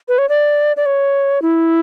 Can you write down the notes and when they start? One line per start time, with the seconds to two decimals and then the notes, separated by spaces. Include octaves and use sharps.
0.08 B4
0.18 C#5
0.29 D5
0.77 D5
0.86 C#5
1.42 E4